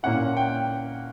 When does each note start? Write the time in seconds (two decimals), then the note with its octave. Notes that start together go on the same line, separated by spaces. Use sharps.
0.03 A#2 A#3 C#4 E4 F#5
0.37 G5